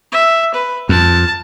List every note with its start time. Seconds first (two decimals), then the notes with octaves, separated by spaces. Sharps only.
0.12 E5
0.54 B4
0.89 F2 A5